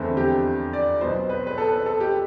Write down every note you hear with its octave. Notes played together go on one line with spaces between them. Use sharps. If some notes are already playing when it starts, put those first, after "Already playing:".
Already playing: F1 E2 D3 A3 C4
G4
D5
B1 B2 B3 C5
B4
B4
A4
B4
A4
G4